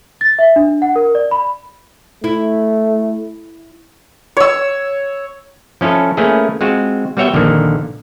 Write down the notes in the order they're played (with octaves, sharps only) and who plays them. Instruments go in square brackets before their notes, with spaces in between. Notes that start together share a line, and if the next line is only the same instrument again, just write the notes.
[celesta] A6
E5
D4
F#5
A#4
D5
B5
[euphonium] A3 [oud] E4
[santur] C#5 E6
[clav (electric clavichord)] F3 C#4 E4 F4 A4
A3 A#3 C#4 E4 G#4 B4
G#3 C4 F4 F#4
G3 B3 F#4 C#5 E5 G5
A#1 D3 D#3 F3 A#3